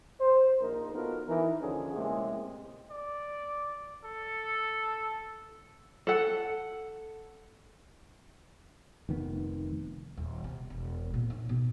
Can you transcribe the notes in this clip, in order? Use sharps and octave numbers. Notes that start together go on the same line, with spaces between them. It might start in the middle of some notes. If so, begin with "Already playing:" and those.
C5
A#1 A#2 D#4 A#4
B3 D#4 F4 F#4 A4 A#4
E3 D#4 A#4
D#2 D3 F3 C#4 D#4 G#4
A2 C3 G#3 A#3 C#4 G#4
D5
A4
A4 F#5
F1 D#3 B3
D#1
C3
E1
A#2
D#4
B2